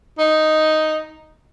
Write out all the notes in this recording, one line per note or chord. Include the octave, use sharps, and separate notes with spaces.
D#4